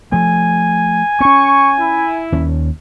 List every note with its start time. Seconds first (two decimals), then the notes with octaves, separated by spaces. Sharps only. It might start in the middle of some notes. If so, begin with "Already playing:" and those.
0.12 F3 A3 G#5
1.20 C4 C#4 C#6
1.80 E4
2.32 D#2 C#4